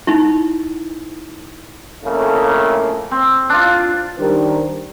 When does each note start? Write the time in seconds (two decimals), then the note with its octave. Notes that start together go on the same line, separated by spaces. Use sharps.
0.07 D#4 E4
2.04 F2 A2 C#3 A3 A#3
3.11 C4
3.50 D4 F4
4.18 D#3 G3 D4 G4 A#4 C5